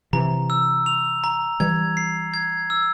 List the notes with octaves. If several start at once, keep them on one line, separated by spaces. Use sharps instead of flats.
C3 E3 A#5
E6
F7
A#5
E3 G3 G#6
C7
G#6
E6